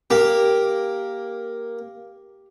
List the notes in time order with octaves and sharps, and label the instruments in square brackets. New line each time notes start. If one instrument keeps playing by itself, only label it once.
[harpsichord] A#3 [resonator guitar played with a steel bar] G4